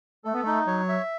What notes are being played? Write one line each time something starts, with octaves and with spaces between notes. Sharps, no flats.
A3 A4
B3
A3 D#4
F#3 C#5
E5